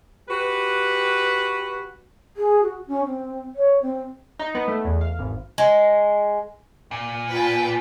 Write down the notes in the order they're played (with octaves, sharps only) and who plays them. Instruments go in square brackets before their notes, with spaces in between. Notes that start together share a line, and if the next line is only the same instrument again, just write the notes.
[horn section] F#4 G4 B4
[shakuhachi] G#4
F#4
C#4
C4
C#5
C4
[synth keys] D#4
B3
A3
E2
F5
G#1
[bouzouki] G#3
[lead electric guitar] A#2
[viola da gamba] F4 [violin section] B4 G5 A5